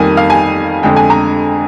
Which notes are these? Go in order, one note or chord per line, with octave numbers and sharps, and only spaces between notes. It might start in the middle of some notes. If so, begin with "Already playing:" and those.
Already playing: F2 D#3 G3 A#3 G#5
F5
G#5
F2 D3 G#3 G5
G#5
A#5